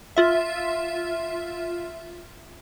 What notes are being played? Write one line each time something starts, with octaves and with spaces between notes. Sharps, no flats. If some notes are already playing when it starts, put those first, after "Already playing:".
F4 E5